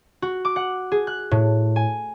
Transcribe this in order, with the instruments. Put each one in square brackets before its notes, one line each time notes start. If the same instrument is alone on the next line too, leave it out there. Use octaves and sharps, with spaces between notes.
[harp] F#4
D6
F#5
G#4
F#6
A2
G#5